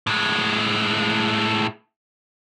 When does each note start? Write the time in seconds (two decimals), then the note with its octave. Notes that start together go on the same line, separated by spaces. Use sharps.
0.07 A2 G#3